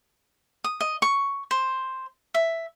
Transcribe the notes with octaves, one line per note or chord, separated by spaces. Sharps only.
D#6
D#5
C#6
C5
E5